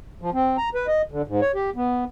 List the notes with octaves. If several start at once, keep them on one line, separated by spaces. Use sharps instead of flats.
F3
C4
A#5
B4
D#5
D3
G#2
C#5
G4
B3